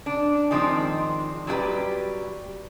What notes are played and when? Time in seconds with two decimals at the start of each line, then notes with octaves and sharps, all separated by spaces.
0.06 D4
0.51 D#3 F3 G#3 C4 D4
1.47 F#3 G3 D4 F4 G4 B4